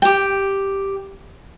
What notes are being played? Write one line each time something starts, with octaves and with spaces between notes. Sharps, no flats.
G4 G5